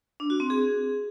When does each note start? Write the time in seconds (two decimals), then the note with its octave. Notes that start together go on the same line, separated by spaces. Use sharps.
0.20 D4
0.30 F#4
0.40 C4
0.50 G#4